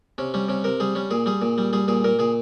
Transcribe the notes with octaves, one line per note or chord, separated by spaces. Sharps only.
C3 C#4
G3 C#4
C3 C#4
C3 A#4
G3 G#4
G3 C#4
A#2 G#4
G3 G#4
A#2
G3
G3 G#4
A#2 G#4
A#2 A#4
A#2 G#4